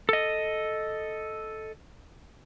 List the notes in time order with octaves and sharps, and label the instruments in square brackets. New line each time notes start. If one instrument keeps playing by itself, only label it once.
[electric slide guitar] A4 D#5